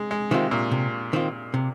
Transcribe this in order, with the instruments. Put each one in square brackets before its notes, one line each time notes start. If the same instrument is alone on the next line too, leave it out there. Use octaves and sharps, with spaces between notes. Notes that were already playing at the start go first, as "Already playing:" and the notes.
Already playing: [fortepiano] G#3
G#3
[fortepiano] C3 [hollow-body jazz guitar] D#3 C4 F4
[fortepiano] A#2
[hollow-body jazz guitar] C3
D#3 C4 F4
C3